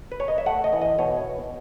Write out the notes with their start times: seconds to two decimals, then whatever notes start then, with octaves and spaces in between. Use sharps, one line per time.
0.12 B4
0.20 C#5
0.28 D#5
0.38 E5
0.46 A3 F#5
0.64 D#5
0.73 E3
0.82 D#5
0.98 B2 C#5